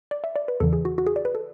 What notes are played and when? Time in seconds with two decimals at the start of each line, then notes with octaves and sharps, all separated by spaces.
0.11 D5
0.24 E5
0.36 D5
0.48 B4
0.60 E2 C#3 E3 A4
0.73 G#4
0.85 F#4
0.98 F#4
1.06 G#4
1.16 D5
1.25 B4
1.35 A4